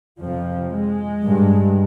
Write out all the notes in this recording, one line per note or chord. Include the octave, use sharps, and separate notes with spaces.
F2 C3 F3
G#3
G2